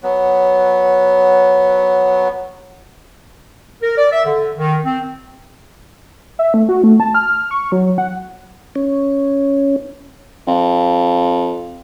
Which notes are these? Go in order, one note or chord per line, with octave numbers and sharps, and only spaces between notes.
F#3 B3
A#4
D5
E5
D3
D#3
C4
E5
A3
F#4
A3
A5
F6
C#6
F#3
F#5
C#4
F2